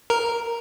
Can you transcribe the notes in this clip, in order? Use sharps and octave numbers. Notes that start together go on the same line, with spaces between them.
A#4